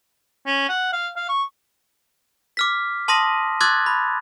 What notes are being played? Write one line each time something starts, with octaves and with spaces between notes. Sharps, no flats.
C#4
F#5
F5
F5
C#6
D6 F6 B6
A5 C6 D#6 A#6 D#7
C6 D6 E6 F#6 G#6 A6
B5